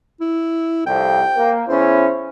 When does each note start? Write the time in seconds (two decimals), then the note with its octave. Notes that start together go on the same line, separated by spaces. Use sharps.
0.21 E4
0.86 C2 F2 G5
1.36 A#3
1.68 E2 C#4 E4 C5